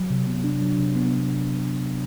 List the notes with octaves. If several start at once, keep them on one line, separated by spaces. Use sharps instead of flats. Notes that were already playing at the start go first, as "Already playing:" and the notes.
Already playing: F#3
C3
B3
D4
F#3
C3
B3